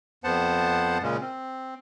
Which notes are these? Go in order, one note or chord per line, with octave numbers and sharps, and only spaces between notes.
F2 B3 C5 F#5 A5
A#2 C#3 G#3 C#4
C4